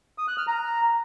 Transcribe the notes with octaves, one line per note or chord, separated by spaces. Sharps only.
D#6
F#6
F6
A#5